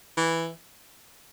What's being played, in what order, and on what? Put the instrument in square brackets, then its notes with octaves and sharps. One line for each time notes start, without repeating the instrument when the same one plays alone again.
[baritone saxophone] E3